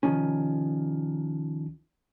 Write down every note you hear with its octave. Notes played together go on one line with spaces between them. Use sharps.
C2 D#3 F3 C#4